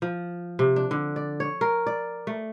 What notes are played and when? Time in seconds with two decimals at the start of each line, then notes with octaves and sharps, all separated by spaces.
0.02 F3
0.59 C3
0.76 D4
0.91 D3
1.16 D5
1.40 C#5
1.61 A#4
1.87 D5
2.27 A3